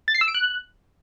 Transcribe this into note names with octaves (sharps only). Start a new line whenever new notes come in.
A6
C7
E6
D7
F#6